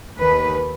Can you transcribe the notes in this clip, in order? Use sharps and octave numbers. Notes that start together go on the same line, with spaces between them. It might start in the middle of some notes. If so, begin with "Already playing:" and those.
D#2 D#3 B4